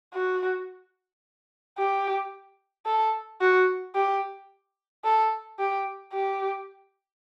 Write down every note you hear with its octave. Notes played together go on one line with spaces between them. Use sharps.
F#4
G4
A4
F#4
G4
A4
G4
G4